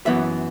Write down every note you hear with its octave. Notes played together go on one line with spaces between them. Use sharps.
F#2 E3 B3 E5